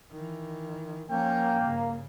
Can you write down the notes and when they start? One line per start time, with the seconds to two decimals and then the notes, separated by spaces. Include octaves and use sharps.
0.11 D#3 E3
1.10 F3 A#3 C#4 G5
1.62 G2 C#3